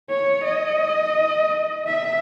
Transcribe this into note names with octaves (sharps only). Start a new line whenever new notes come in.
C#5
D#5
E5